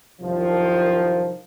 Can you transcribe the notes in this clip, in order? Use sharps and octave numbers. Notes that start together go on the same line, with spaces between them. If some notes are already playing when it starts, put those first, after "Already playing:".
C2 F#2 D#3 F3